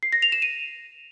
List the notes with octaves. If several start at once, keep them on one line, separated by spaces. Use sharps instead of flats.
C7
A#6
F7
E7
D#7